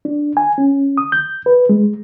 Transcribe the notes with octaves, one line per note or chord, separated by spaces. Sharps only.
D4
G#5
C#4
D#6
G6
B4
G#3